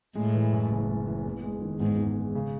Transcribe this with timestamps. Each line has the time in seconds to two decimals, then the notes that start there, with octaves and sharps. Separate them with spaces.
0.15 A2 G#3
0.34 E3
0.52 F#2
0.71 F#1
0.89 G#3
1.07 E3
1.25 E2
1.43 G#3
1.61 D#3
1.80 E2 G#2
1.98 E2
2.17 G#3
2.35 C#3